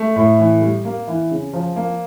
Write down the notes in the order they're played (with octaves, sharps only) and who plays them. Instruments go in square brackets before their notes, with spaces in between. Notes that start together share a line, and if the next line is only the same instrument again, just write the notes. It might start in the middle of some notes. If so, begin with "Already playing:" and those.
Already playing: [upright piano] A3
A2
E3
G3
A#3
E3
C#3
F3
A#3